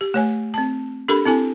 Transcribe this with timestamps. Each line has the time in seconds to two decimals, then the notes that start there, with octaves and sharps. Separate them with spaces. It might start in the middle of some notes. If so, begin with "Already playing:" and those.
0.01 G4
0.14 A3 C#5 G#5
0.54 C4 A5
1.08 D4 G4 A4 A#4 B5
1.26 C4 E4 A4 G#5